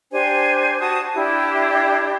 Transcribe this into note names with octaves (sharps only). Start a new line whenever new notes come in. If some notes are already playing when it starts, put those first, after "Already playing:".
D4 G4 C5 G#5
F#4 A5 D#6
D4 E4 G4